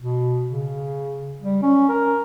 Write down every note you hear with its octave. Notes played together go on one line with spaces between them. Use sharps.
B2
C#3
G3
C#4
A#4